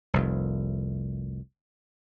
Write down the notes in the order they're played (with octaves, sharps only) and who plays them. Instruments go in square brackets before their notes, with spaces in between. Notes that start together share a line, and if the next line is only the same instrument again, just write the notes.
[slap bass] F1 C2